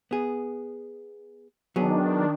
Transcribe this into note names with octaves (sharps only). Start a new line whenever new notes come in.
B3 G#4
D#3 F#3 B3 D4 G#4